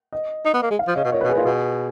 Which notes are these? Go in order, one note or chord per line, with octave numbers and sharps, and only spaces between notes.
D#5
D#4
B3
A#3
G#3
F5
F3
C#3 D#5
B2
A#2 C#5
B2 B4
G#4
A#2
F4
B2 G#4